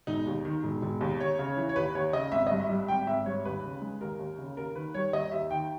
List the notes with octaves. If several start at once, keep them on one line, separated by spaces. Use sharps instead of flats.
E1 D#4
D#2
D#3
E1
E1
D#2
D#2 C#5
C#3
E3
C#5
D#2 B4
D#2 C#5
C#3 D#5
G#1 E5
G2 D#5
E5
G3
G#1 G5
G#1 E5
G2 C#5
D#2 B4
C#3
G#3
D#2 A#4
D#2
C#3
D#2 A#4
D#3 B4
G3 C#5
D#2 D#5
D#2 E5
D#3 G5